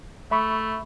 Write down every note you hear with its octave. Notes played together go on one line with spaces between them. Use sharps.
A3 E5 B5 C#6